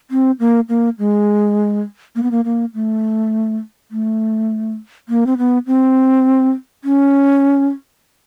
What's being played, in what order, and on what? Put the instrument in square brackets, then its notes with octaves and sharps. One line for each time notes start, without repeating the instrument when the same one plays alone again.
[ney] C4
A#3
A#3
G#3
A#3
B3
A#3
A#3
A3
A3
A#3
C4
B3
C4
C#4